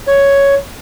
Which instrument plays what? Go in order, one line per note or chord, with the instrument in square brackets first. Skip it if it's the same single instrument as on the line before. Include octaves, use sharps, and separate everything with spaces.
[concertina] C#5